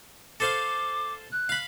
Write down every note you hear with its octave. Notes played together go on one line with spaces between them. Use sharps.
A4 C5 F5 D6
F#6
F5 B5